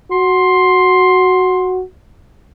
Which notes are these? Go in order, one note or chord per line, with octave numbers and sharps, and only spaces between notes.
F#4 C6